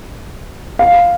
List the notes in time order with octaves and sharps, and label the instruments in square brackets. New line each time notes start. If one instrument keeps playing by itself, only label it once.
[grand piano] F5